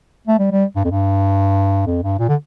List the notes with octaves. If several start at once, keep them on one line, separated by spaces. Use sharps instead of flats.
A3
G3
G3
G2
F2
G2
F2
G2
A#2
D3